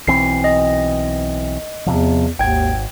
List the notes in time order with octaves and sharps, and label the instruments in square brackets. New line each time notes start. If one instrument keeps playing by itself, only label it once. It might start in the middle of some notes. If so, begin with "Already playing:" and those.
[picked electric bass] B1 E3 C4 [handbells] C7
[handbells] D#5
[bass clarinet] E2 [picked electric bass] C3 F3
[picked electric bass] G#1 [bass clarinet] D#2 [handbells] G5 G#6